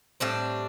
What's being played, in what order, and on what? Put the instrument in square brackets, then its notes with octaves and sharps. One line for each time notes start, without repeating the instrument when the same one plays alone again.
[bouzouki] A2 G3 C4 D4